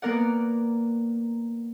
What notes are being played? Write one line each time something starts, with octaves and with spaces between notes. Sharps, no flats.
A#3 B3 A#4 D5 F#5